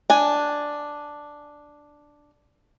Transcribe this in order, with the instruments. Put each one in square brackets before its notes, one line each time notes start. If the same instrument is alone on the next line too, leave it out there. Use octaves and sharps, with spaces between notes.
[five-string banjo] D4 G#5